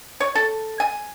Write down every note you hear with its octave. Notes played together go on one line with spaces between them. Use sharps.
C#5
A4
G#5